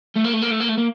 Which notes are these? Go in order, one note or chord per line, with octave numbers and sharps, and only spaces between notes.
A3
A#3
A3
A#3
A3
A#3
A3
A#3